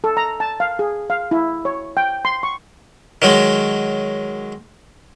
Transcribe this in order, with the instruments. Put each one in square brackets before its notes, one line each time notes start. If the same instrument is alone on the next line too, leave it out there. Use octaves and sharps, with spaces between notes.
[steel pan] A4
A#5
A5
F5
G#4
F5
E4
C#5
G5
C6
C#6
[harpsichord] D#3 F#3 G#3